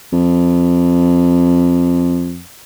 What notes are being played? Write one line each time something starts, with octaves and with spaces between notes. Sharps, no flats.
F2